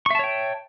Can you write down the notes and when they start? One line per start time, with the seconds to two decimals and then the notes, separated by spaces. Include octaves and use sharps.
0.06 C#6
0.10 E5
0.15 A5
0.19 C#5
0.24 G5